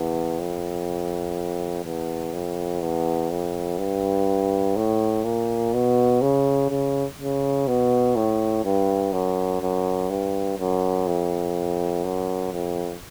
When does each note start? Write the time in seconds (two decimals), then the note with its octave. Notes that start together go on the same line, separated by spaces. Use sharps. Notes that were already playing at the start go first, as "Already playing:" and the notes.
Already playing: E2
0.39 F2
1.84 E2
2.33 F2
2.82 E2
3.30 F2
3.78 G2
4.76 A2
5.24 A#2
5.73 B2
6.22 C#3
6.70 C#3
7.19 C#3
7.67 B2
8.16 A2
8.64 G2
9.13 F#2
9.61 F#2
10.10 G2
10.58 F#2
11.07 F2
12.04 F#2
12.53 F2